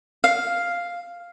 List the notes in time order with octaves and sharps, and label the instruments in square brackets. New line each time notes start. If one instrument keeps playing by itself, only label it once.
[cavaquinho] F5